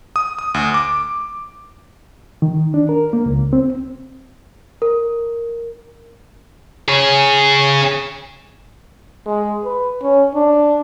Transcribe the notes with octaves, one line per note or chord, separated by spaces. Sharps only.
D#6
D#6
D2
D6
D#3
D4
A#4
A#3
C#2
C4
A#4
G#4 C#5
G#3
B4
C#4
D4